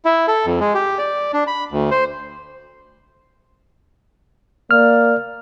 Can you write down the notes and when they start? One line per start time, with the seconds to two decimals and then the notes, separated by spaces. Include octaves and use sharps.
0.05 E4
0.27 A4
0.46 F2
0.60 G#3
0.74 G4
0.98 D5
1.33 D4
1.47 B5
1.72 D2
1.91 C5
4.71 A#3 D5 F6